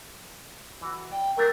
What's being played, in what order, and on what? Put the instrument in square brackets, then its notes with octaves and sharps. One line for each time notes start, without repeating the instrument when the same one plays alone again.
[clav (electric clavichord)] E3 F#4
[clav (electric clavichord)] D5 [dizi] G5
[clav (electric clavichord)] F#3 A3 D4 [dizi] A#4